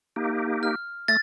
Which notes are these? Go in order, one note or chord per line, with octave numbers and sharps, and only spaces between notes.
A#3 D#4 G4
F6
A3 A6 A#6